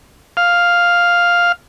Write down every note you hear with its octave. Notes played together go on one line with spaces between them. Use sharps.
F5